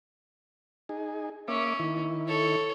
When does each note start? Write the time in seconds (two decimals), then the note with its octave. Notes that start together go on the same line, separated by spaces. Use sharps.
0.89 D#4 G#4
1.48 A#3 C#4 E5 D6
1.79 D#3 E4
2.28 A4 C#5